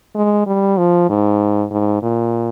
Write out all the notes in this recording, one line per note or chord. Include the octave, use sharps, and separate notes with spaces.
G#3
G3
F3
G#2
G#2
A#2